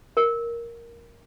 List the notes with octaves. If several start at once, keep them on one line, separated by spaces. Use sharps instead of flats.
A#4